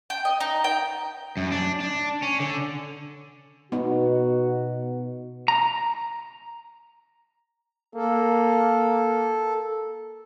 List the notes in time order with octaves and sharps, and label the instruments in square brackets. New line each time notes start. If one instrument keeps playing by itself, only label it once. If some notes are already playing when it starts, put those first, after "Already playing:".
[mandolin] G5
D#5
D#4
G5
[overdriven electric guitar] F#2
D4
D4
C#4
D3
[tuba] B2 [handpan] B3 D#4 [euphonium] F#4
[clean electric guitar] A#5
[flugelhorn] A#3 [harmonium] A4